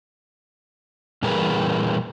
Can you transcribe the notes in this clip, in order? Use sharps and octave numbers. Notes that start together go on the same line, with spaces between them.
A#2 E3 G3 G#4 A#4 B4